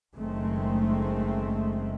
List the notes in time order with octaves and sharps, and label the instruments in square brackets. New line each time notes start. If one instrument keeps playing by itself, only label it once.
[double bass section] F#1 D#3 G#3 A3 C4